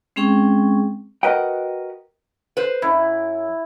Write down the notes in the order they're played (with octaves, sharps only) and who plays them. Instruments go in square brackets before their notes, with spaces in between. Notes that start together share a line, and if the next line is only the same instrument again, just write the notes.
[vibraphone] G#3 C4 C#4 G#4 G5 C#6
[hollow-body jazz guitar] F#4 A#4 B4 D#5 F#5 G5
[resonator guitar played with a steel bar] B4 C5
[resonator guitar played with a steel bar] F#2 [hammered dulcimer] E4